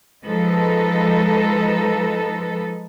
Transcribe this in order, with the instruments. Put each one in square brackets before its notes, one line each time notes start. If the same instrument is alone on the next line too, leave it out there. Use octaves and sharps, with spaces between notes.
[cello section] F3 G#3 D#4 A4 B4